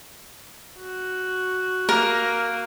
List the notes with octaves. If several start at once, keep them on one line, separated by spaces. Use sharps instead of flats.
F#4
A#3 A#4